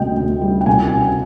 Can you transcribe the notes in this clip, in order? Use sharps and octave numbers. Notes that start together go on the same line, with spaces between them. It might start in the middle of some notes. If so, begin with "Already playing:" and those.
Already playing: D2 C3 G3 D#5 G5
D2
G3
G5
C2 G#5
C3